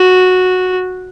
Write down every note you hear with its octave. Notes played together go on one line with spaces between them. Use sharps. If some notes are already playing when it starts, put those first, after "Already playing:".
Already playing: F#4